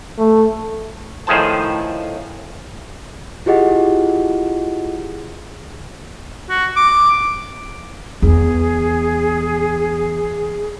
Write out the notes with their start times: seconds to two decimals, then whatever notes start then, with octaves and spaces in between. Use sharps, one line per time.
0.18 A3
1.27 A2 D#3 F3 G#4 C5 A5
3.46 E4 F4 G4 G#4 D#5 F#5
6.50 F#4
6.77 D6
8.22 E2 G#4